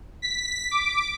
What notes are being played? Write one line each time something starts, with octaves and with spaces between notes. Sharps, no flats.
B6
D6